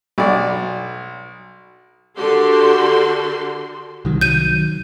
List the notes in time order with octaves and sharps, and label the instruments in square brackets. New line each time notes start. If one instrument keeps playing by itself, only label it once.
[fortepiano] B1 D5
[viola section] D3 F#4 G4 A4 A#4 C6
[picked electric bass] C2 D#3 F#3
[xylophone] G6 D#7